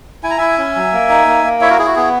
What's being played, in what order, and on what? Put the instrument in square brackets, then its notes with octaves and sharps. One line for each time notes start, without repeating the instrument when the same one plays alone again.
[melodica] E4 G#5
A#5
E4 E5 G#5
C#4
F#3
A#3
D#4
A#3
A#3
E4 C#5 E5
F#4 A#4
E4 G#4
F#4
B3 G#4